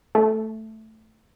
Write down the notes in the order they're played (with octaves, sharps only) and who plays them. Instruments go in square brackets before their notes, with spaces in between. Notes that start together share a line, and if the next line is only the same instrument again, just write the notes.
[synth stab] A3